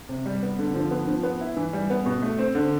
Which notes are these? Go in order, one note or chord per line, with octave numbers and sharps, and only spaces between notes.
C3
G3
B3
D3
F3
B3
F3
B3
E4
E3
G3
B3
B2
A3
C4
D3